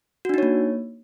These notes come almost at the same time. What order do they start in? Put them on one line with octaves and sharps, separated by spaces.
F#4 D4 D#4 C#5 A#3